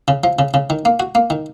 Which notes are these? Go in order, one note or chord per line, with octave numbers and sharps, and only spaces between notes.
C#3
F3
C#3
C#3
D#3
A#3
F#4
A#3
D#3